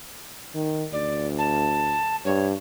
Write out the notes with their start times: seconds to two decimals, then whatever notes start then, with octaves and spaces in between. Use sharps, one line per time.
0.55 D#3
0.93 D2 D5
1.38 A5
2.25 G2 C#5